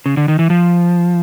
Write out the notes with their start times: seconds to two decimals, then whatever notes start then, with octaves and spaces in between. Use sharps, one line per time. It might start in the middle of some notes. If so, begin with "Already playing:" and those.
0.06 C#3
0.17 D3
0.28 D#3
0.39 E3
0.50 F3